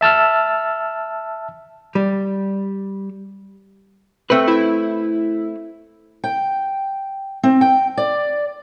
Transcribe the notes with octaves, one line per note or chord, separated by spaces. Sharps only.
E5 A5 E6 F6
G3
A3 C4 B4
E4
G5
C4
G5
D5